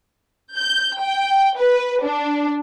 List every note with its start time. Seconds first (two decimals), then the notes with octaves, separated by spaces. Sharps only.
0.57 G6
1.01 G5
1.59 B4
2.03 D4